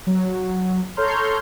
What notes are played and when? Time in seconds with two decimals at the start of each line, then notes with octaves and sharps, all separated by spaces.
0.07 F#3
0.96 A4 C#5 A#5 C6 F6 G6